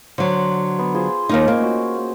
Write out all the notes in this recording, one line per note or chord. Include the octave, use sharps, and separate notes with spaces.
D3 F#3 C5
B3
F4 G#4 C5
D#2 A#3 D#4
A#3 C#4 D#4 C5
F#4 E6